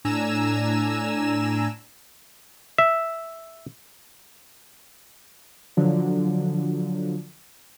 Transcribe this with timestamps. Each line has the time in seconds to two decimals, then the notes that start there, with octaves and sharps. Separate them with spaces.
0.05 A2 D4 G#5 A#5 E6 E7
2.78 E5
5.77 D3 F3 F#3